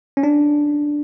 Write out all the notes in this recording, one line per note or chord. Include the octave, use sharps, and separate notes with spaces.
C#4
D4